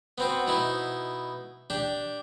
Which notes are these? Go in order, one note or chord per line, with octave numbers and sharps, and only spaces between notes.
B3 C4 F#4
B2 D#4 E4
D4 G4